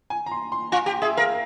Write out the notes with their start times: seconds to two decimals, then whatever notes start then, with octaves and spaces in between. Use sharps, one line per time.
0.10 G#5
0.26 A#5
0.32 C6
0.52 C6
0.72 F4 G#5
0.86 G4 G5
1.02 G#4 E5
1.17 A#4 F5